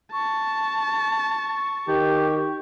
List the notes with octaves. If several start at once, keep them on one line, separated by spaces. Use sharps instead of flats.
A5 C#6
D#3 G4